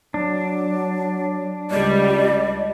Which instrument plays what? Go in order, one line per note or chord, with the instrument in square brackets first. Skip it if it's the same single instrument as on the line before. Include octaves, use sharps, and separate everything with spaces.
[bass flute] F#3 [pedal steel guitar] D4
[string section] C#2 G3 [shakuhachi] D5 [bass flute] D#5